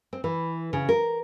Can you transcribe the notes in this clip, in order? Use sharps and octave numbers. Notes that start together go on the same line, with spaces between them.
C4
E3
C#3
A#4